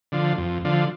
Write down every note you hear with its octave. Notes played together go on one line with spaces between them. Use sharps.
D3 F3
F2
D3 F3